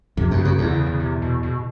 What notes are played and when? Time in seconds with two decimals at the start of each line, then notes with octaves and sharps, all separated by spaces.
0.17 F2 C3
0.31 F#2
0.38 C#3
0.45 F#2
0.58 E2 C3
0.68 D3
0.73 C#3
0.87 C#3
1.00 C3
1.22 B2
1.43 B2